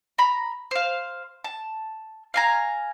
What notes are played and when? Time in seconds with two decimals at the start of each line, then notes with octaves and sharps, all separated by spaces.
0.18 A#5 B5
0.71 C5 F5
1.44 A5
2.34 F5 G#5 A#5